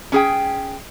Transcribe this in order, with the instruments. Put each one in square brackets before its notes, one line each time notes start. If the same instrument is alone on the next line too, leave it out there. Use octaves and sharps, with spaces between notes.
[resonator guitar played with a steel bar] C#4 G#4 G5